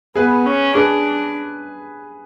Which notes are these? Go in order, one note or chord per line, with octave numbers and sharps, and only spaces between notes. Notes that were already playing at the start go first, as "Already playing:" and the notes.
B3 G#4 B4
C#4
D4 G#4 B4